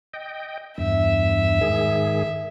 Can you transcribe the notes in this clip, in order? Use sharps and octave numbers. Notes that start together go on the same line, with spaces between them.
D#5 G5
E2 G2 E5
G#2 D#3 G#4